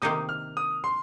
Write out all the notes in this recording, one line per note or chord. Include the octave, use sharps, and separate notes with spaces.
C3 D#3 A#3 D#4 G4 D#6
F6
D#6
C6